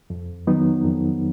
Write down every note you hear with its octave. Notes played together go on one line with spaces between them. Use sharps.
F2
D#3 F#3 B3 D#4
F2